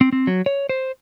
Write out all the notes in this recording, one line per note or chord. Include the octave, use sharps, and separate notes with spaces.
C4
C4
F#3
C#5
C5